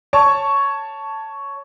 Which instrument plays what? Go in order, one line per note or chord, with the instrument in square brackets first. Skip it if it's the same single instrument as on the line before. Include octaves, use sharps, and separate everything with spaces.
[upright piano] C#5 A5 C#6